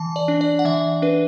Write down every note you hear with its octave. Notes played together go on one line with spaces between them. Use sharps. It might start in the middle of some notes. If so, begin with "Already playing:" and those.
Already playing: E3 A5
D5
D4
D5
F#5
E3 E5
D4 B4